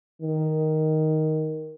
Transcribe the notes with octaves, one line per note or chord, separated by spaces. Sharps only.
D#3